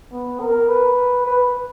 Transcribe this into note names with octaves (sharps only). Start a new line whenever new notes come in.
B3
A#4
B4
B4